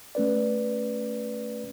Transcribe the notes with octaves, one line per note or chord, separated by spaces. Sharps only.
A3 C#4 B4 D5